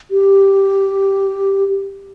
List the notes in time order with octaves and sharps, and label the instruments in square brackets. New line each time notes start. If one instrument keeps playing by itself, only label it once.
[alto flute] G4